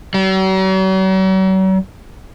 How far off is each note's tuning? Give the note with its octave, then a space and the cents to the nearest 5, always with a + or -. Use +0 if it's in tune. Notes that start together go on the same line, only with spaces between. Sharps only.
F#3 +45